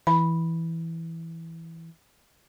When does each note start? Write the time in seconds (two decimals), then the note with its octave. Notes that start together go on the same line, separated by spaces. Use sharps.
0.07 E3 B5